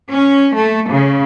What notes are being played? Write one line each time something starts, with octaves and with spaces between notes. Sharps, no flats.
C#4
A3
C#3